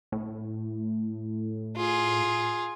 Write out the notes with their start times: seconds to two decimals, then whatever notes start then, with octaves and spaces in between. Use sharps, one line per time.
0.12 A2
1.76 F4 G#4